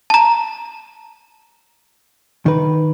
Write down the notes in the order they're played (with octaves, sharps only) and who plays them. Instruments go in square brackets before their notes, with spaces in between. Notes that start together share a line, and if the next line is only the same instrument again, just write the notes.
[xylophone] A5 A#5
[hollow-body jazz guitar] D#3 B4